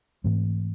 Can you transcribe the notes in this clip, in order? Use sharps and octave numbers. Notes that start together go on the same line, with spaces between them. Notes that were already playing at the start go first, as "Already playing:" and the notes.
G#2 E3 A3 C4